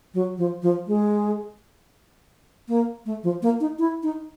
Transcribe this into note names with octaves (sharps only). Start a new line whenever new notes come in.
F#3
F3
F3
G#3
A#3
A3
F3
A#3
D#4
E4
D#4